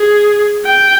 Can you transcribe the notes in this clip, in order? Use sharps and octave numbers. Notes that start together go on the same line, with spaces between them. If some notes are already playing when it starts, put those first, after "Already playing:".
Already playing: G#4
G5